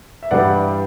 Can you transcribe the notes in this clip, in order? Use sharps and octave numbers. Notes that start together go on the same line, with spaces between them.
E5
G2 E3 G3 D5 F#5